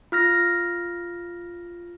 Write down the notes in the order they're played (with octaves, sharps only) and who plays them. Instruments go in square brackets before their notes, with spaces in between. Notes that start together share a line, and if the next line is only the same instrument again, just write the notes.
[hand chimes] F4 F6 A#6